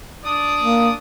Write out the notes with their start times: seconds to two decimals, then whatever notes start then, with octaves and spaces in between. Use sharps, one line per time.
0.25 D4 D5 D#6
0.60 A#3